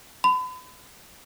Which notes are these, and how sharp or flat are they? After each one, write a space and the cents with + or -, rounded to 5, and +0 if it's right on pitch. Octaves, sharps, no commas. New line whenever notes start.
B5 +40